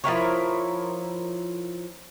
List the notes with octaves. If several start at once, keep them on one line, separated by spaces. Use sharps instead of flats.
F3 E4 A#4 C#5